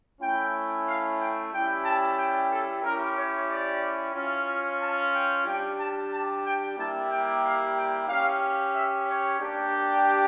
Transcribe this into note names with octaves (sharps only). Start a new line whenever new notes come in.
A3 C#4 E4 G5
F5
G5
G3 C#4 E4 G4 G5
A5
G5
A4
C#4 E4 G4 A#4
C#5
D5
C#4 F4
A5
G5
G3 D4 G4 G5
A5
A5
G5
G3 A#3 E4 G4 A5
G5
F5
G5
C#4 G4 F5
E5
C#5
A#3 D4 G4